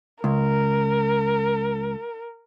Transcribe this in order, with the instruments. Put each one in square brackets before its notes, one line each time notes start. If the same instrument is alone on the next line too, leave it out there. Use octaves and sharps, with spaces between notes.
[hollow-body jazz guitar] C#2 [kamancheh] A#4